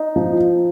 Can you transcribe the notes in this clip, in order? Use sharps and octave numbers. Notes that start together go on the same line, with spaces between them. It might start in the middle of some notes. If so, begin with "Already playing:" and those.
Already playing: D#4
F3